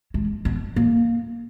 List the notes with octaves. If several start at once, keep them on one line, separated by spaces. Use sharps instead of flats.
G#3
B3
A#3